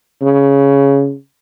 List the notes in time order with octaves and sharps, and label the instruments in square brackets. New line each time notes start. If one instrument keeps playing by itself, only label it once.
[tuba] C#3